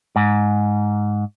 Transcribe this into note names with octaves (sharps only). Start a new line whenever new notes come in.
G#2